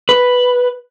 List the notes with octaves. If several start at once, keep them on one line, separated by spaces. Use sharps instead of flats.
B4